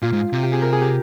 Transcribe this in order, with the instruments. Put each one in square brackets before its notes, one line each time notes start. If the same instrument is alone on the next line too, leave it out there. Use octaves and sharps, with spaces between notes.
[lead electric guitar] A#2 [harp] F4
[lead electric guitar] G#2
C3
[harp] G4
G#4
A#4
G#4
G4